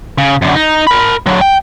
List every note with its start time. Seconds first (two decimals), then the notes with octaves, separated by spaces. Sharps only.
0.18 C#3
0.42 F#2 D3
0.55 D#4
0.87 A#4 B5
1.26 D3 F#3
1.41 G5